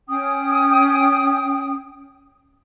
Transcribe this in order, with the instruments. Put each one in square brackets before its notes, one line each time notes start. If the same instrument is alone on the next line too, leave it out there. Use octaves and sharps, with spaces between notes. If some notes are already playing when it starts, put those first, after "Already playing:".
[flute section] C#4 G5 D#6